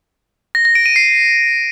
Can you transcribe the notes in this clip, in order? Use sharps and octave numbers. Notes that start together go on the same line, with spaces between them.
A#6
A#6
D7
D#7
C7